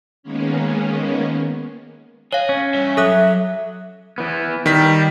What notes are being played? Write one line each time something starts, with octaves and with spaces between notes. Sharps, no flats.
D#3 G#3 A#3 B3 C#4
G#4 C#5 F5
C#4
G2 E5
F#3 A4 E5 D#6 F#6
E3 B3
D#3 G3 B6